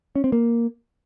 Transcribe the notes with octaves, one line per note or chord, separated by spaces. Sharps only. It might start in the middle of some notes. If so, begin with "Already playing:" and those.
C#4
C4
A#3